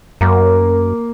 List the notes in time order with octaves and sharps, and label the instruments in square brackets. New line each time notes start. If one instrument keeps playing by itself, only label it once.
[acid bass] F#2 [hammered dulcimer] A#3